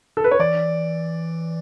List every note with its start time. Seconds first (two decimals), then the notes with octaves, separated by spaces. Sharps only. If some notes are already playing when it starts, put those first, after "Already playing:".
0.17 A4
0.24 B4
0.31 C#5
0.39 E3 D5